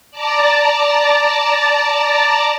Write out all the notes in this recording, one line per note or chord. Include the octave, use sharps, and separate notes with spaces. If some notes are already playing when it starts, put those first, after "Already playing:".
D5 A5 A#5